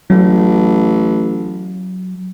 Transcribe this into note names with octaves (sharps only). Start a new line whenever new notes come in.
A1 F#3